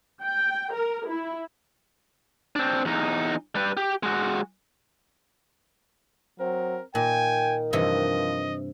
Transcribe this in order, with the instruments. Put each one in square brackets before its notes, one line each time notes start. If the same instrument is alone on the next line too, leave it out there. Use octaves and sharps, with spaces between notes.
[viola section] G5
A#4
E4
[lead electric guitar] C4 D4
E2 D#4
G3 B4
G4
G#3 F#4
[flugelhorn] F#3 [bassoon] C4 [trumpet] A#4
[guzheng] A#2 [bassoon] D#3 [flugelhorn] G5 [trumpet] G#5
[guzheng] G2 C3 E3 [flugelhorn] F3 [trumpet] D#5